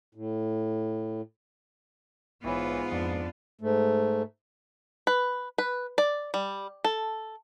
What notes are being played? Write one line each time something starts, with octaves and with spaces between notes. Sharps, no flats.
A2
A#1 G#2 E3 B3 F4 C#5
F2 F3 D4 D#6
G#2 A3
B4
B4
D5
G3
A4